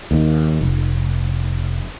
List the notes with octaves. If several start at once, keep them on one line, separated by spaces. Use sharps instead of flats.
D#2
F1